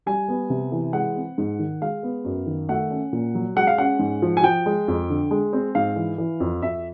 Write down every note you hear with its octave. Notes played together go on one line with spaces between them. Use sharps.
G3 G#5
B3
C3
E3
G#3 F#5
C4
G#2
D#3
G#3 F5
B3
F#2
D#3
A3 F#5
C#4
A#2
F#3
G#3 F#5
F5
C#4 F#5
G#2
F3
G#5
F3 G5
G#3
F2
D3
G#3
C4
G#2 F5
E3
E3
F2
F2 E5